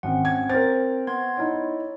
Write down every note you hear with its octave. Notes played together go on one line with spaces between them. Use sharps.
G#1 C4 C#4 F#5
G#6
C4 A#4 C5 A6
B3 C6 G#6
D#4 E4 C#5